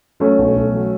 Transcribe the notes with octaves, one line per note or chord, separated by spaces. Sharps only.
F#3 A3 C#4
B1
B1
F#3